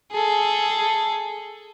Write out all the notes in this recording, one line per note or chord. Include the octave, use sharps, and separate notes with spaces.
G#4 A4